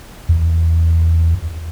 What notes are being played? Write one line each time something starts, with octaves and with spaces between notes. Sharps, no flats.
E2